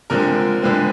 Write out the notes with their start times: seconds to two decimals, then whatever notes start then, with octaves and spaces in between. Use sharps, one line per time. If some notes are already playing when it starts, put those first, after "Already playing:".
0.10 D3 F3 G#3 C4 A#4
0.62 D3 F3 G#3 C4 B4